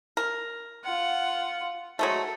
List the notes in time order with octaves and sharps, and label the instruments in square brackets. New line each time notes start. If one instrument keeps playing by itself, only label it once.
[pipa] A#4
[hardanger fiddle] F4 F#5
[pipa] F#3 G#3 A3 [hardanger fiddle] A4